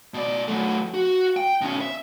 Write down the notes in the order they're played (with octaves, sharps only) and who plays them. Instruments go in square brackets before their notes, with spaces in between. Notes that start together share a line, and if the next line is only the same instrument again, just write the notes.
[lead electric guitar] B2 D5
F#3 A3
F#4
G5
B2 C#4
E5